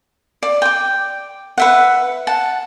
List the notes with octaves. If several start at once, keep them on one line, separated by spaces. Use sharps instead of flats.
D5
G5 D6
B4 E5 F#5
F#5 A5